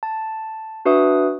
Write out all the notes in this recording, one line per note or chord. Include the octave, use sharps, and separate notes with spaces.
A5
D4 F#4 B4 E5 D#6